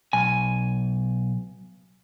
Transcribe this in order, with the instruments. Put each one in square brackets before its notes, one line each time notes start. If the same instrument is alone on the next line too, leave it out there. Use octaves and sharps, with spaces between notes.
[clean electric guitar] B1 G#5